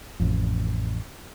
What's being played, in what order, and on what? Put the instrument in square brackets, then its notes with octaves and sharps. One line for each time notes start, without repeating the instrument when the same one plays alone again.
[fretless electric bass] A1 F2